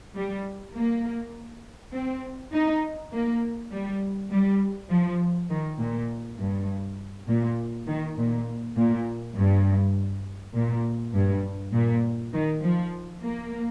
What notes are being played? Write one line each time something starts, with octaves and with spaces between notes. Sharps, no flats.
G3
A#3
C4
D#4
A#3
G3
G3
F3
D#3
A#2
G2
A#2
D#3
A#2
A#2
G2
A#2
G2
A#2
D#3
F3
A#3